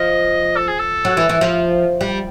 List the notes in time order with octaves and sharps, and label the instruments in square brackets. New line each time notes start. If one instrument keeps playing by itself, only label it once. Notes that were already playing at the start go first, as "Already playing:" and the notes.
Already playing: [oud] F3 [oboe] D#5
[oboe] A4
G#4
A4
[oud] F#3
E3
E3
F3
G3